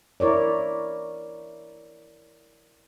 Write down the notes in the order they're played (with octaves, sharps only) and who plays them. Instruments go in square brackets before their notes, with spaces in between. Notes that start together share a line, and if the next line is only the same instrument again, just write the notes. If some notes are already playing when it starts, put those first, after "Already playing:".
[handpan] E4 A#4 C#5 D5